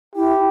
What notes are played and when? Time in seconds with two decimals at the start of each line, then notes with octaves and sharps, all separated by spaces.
0.15 E4 G4